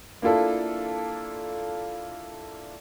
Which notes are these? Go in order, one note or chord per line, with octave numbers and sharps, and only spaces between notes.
A#3 D4 E4 F4 A4